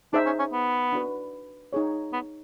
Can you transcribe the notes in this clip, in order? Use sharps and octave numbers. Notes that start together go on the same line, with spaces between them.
D4 D#4 G#4 C5 E5
C#4
C#4
B3
D4 F#4 B4
D#4 G#4 C#5
B3